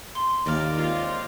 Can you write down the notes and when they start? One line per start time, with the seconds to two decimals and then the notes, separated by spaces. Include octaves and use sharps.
0.15 C6
0.46 D#2 A#3 D5 F5
0.77 G#3 C4 F4